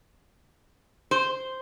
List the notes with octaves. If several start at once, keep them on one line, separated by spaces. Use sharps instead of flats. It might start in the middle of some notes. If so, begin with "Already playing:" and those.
C5